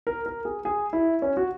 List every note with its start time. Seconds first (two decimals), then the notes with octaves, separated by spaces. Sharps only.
0.07 A#4
0.26 A#4
0.45 G#4
0.65 G#4
0.93 E4
1.22 C#4
1.37 F#4